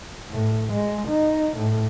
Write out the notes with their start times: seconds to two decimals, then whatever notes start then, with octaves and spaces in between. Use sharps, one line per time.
0.31 A2
0.73 G#3
1.08 D#4
1.57 A2